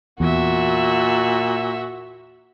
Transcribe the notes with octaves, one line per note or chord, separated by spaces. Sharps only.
E2 A#2 F#4 E5